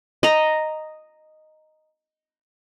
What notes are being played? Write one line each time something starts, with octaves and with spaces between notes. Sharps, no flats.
D#5 A#5